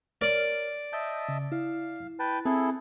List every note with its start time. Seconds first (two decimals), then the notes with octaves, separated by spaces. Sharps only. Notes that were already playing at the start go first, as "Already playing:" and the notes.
0.21 A#4 C#5 D5 F6
0.93 D#5 E5 A5 G6
1.29 C#3
1.52 E4 F5
2.19 B4 G5 A5
2.45 C4 E4 G#4 A4